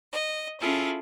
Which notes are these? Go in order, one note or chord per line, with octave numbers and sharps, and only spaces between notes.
D#5
C#4 E4 F4 G#4 A4